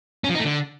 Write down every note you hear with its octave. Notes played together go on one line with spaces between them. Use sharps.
C#4
F3
D#4
A3
D3